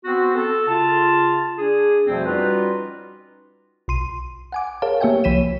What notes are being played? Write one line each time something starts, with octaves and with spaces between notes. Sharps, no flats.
B3 C4 F#4
A4
C#3 F4 A5
D4 G#4
F2 B2 F3 G3 A3 C4
G3 C#4 D#4 F4 F#4 B4
B1 C6 D#7
F#5 G#5 D6
G#4 A#4 C#5 F5 A5
A#3 G4 C#5 E5 G5 G#5
C2 F3 C#5 B6 D#7 E7